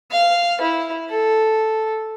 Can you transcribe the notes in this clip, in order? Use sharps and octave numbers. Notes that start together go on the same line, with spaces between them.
F5
E4
A4